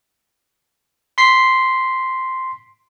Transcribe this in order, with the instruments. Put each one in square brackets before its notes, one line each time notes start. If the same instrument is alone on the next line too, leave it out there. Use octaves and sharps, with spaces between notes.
[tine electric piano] C6 B6 C7